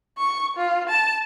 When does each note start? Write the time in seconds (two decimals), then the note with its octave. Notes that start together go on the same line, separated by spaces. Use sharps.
0.18 C#6
0.57 F4
0.89 A5